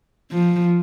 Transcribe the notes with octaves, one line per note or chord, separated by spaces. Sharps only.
F3